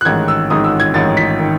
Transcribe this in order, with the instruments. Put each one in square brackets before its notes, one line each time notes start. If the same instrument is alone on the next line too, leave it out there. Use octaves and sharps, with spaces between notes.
[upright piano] F#6
A1 G#2 D#3 G#6
E6
A1 G#2 D#3 D#6
E6
G#6
A1 G#2 D#3 A6
B6
D#3